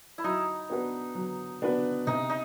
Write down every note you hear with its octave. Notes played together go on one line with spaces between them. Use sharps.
E4
F#3 D#4
B3 D4 F#4 B4
F#3
B3 D4 F#4 B4
C3 D#4
D#4